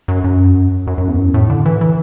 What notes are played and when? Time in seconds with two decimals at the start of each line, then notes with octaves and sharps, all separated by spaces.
0.08 F#2
0.24 F#2
0.87 F#2
0.98 F#2
1.08 E2
1.18 F#2
1.34 A2
1.50 D3
1.65 E3
1.81 E3